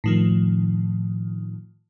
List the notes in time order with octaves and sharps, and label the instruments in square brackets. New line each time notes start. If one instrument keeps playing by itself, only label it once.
[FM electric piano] A2 D#3 F3